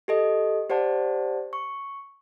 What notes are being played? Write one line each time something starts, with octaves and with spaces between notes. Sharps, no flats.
G4 A4 D#5
G4 C5 D5 F#5 A5
C#6